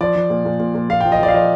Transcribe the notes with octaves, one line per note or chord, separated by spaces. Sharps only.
F3 D5
F3
A#2
A#2
A#2
A#2
A#2 F5
G5
F3
D#5
F3 D5
F5
F3 D#5